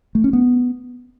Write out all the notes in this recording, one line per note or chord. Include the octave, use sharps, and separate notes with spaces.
A3
C#4
B3